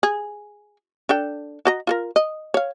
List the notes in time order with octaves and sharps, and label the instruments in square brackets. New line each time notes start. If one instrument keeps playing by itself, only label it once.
[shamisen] G#4
D4 A4 G5
F#4 D#5 A#5
F4 A4 A#4
D#5
C#5 F5